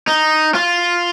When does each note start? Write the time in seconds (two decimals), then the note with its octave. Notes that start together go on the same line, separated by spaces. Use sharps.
0.08 D#4
0.55 F4